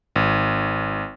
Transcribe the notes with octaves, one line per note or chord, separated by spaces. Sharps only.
G#1